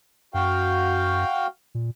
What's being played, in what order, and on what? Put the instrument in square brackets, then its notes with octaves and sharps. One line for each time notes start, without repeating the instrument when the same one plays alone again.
[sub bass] F#2 [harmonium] F#4 F5 G5
[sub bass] A#2